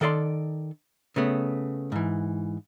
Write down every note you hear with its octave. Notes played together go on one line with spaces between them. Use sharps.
D#3 A4 D5 E5 C6
C#3 A3 B3
G#2 E3